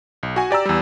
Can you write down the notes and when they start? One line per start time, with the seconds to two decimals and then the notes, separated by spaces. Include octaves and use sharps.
0.23 B1
0.36 F#4 G#5
0.51 G4 D5 A#5 E6
0.66 E2 G3